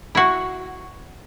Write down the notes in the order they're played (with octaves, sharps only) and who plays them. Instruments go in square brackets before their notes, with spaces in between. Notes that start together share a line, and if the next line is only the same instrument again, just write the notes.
[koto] E4 F#4